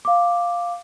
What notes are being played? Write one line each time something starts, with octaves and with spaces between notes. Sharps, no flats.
F5 D6